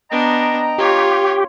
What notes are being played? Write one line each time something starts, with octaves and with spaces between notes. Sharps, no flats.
B3 D4 D#5 G5 A#5
F4 G4 C#5